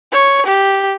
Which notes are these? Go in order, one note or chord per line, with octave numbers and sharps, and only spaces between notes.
C#5
G4